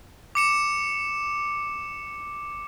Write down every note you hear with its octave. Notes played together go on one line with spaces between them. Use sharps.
D6 C#7 E7